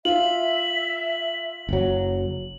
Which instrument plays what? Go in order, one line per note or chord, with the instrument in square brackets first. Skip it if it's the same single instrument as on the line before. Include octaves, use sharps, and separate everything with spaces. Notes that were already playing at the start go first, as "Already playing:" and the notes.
[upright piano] F4 [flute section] E5 [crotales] F#7
[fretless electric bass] F#1 F#3